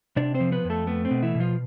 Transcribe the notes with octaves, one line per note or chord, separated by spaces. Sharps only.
C3 D4 D5
C4 C5
F3
B3 B4
F2
A3 A4
A3 B3
C4
B2
E3 E4
B2
F3 F4